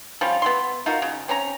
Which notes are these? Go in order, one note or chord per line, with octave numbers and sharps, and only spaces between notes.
F3 G3 C#4 F4
B3 E4 C6
D#4 F4 F#4 A#4
C#3
C4 C#4 A#4 A#5